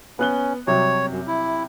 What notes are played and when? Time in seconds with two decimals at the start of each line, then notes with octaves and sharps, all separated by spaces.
0.19 B3 C#4 F#6 G7
0.67 C3 F#3 G3 C#5
1.11 F#2
1.27 E4